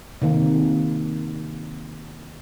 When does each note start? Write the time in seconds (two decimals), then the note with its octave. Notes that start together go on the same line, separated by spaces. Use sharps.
0.22 C3 D#3 A#3